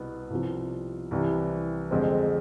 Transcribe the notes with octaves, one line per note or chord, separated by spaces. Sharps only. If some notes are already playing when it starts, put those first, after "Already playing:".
Already playing: C2 B2 B3
C2 C3 F3
C2 C3 E3
F1 F2 D3 G#3 C4